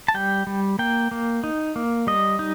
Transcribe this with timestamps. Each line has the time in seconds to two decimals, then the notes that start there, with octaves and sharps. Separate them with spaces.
0.08 A5
0.14 G3 G5
0.47 G3
0.79 A#3 G5
1.11 A#3
1.44 D#4
1.76 A#3
2.07 G3 D#5
2.39 D#4